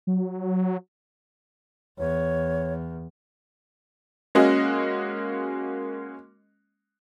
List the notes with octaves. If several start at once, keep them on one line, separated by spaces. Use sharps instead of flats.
F#3
E2 C#5
G#3 A#3 C#4 F#4 D#5